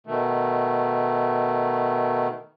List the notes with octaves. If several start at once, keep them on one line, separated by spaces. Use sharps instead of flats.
B2 D#3 A3